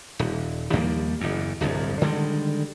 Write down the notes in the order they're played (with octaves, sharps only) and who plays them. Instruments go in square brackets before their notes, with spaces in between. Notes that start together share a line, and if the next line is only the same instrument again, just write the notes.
[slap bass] D#1
D#2 F3 G3 A#3
F#1 E2
D1 G1 C2 F2
D3 D#3 G3 G#3